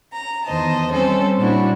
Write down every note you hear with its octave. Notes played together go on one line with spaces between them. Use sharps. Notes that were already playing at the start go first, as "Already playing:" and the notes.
A#5
E2 D#3 C5 D#5 A5
G3 C4 C#4 A4 C5
A#2 G3 D4 E4 F#4